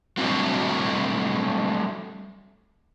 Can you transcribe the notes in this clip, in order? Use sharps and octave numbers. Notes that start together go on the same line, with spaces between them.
F#3 G3 A3 C4 D4 F#4